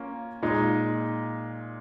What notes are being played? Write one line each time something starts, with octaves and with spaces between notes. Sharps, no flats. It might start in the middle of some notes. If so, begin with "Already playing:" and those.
Already playing: A#3 C#4 F4 A#4
A#2 G#3 D#4